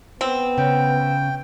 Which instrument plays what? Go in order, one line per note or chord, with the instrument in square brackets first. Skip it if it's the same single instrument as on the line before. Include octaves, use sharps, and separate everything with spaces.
[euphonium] B3 [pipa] C4
[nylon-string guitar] C#3 [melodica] G5